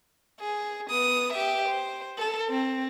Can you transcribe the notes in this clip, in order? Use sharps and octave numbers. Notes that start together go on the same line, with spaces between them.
G#4
B3 D#6
G4 E5
C5
A4
C4